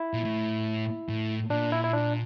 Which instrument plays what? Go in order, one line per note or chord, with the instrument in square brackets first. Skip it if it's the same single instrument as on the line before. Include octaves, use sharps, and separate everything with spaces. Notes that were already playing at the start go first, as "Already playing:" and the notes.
Already playing: [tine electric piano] E4
[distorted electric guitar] A#2
A2
A2
[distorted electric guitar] A#2 [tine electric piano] D4
[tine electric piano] E4
E4
D4